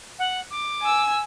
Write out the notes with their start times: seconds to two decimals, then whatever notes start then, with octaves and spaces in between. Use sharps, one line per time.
0.19 F#5
0.50 D6
0.82 G#5 E6